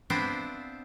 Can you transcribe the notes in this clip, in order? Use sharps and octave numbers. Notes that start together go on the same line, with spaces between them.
B3 C4 D4 E4 F4 C5